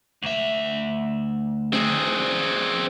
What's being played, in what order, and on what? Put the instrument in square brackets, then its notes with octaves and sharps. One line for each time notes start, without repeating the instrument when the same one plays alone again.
[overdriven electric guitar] D2 E5
[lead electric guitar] C4 G#4